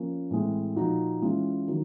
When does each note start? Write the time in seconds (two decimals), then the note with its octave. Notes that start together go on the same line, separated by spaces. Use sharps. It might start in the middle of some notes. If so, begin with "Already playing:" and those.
Already playing: F3 A#3 C#4
0.30 A2 E3 G#3 C4
0.76 A#2 F3 A#3 D#4 F#4
1.21 E3 G#3 C#4 F4
1.68 D#3 F#3